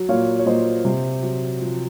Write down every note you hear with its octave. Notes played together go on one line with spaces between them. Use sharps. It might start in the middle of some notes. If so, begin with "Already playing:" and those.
Already playing: F#3
A#2 C#5 F5
C#5
A#2 C5 D#5
C3
F#3
F3